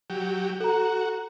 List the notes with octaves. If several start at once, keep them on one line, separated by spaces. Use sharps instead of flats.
F#3 G4
F#4 A4 A#5